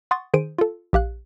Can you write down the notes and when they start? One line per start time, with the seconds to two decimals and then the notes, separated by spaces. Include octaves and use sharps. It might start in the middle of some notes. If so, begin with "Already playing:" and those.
0.11 F#5 C6 C#6 D#6 A6
0.34 D#3 G#4 C5 D7 D#7
0.58 F4 A4
0.93 A#1 G4 F5 F#6